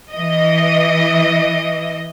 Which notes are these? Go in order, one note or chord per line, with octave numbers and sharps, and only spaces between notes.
E3 D#5